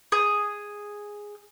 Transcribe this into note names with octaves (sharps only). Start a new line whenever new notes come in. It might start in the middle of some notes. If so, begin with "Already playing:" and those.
G#4